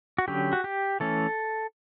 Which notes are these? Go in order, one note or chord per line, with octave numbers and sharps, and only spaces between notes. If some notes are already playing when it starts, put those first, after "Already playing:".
F#4
D3 F#3 C#4 G4
F#4
G4
E3 A3 C#4 A4